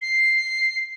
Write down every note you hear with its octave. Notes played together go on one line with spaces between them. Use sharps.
C7